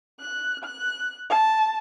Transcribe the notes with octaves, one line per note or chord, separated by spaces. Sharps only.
F#6
F#6
A5